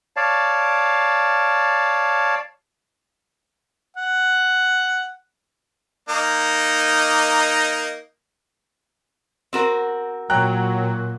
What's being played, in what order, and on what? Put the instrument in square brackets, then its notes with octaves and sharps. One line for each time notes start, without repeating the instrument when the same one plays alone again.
[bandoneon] C#5 D5 F5 A5
[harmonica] F#5
A#3 D#4
[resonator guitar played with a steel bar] C4 F#4 A#4
[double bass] A#2 [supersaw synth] F#3 [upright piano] G5 A#5 F#6